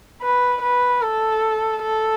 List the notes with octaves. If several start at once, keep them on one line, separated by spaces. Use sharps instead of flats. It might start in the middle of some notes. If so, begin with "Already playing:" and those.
B4
B4
A4
A4